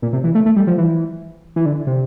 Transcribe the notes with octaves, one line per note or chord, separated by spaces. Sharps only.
A#2
C3
E3
A3
A3
G3
F3
E3
E3
D3
C3